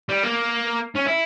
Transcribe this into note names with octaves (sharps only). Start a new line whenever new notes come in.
G3
A#3
C#4
E4